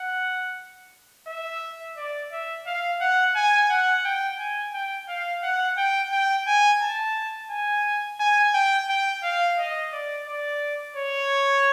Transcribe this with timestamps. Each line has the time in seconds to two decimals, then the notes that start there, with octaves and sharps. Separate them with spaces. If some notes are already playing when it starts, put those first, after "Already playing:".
Already playing: F#5
1.28 E5
1.97 D5
2.32 E5
2.66 F5
3.01 F#5
3.35 G#5
3.70 F#5
4.04 G5
4.39 G#5
4.74 G5
5.08 F5
5.43 F#5
5.77 G5
6.12 G5
6.47 G#5
6.81 A5
7.50 G#5
8.20 G#5
8.54 G5
8.89 G5
9.23 F5
9.58 D#5
9.93 D5
10.27 D5
10.96 C#5